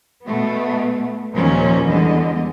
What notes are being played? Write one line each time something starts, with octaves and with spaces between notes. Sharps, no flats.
B2 A3 B3
D#2 A#2 F3 C#4
E2 D3 G3 G#3 B3 D#5